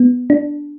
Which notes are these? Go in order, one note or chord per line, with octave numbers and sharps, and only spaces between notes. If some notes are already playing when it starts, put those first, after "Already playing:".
Already playing: B3
D4